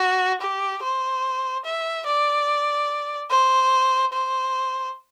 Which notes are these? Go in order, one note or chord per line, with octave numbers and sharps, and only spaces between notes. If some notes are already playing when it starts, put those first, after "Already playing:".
Already playing: F#4
G4
C5
E5
D5
C5
C5